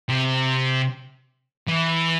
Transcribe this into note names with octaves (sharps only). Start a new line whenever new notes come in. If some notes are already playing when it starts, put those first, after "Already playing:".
C3
E3